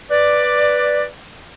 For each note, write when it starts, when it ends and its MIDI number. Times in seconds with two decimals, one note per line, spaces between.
0.11 1.05 71
0.11 1.05 74